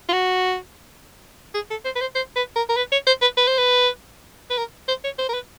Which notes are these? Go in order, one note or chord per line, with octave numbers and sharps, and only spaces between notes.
F4
F#4
G#4
A4
C5
B4
C5
C5
B4
A#4
A#4
B4
C#5
C5
B4
B4
C5
B4
B4
A#4
C5
C#5
C5
A#4
B4